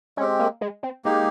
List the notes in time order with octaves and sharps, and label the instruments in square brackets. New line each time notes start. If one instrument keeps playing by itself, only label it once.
[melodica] G#3 C4 G4 [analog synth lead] C#4
[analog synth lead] A#3
G#3
C4
[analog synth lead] G#3 [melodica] A#3 D#4 G4